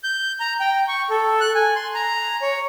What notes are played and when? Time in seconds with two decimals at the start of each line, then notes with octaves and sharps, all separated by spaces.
0.04 G6
0.40 A#5
0.60 G5
0.88 C#6
1.10 A4
1.41 F#6
1.55 G#5
1.76 C6
1.95 A#5
2.42 C#5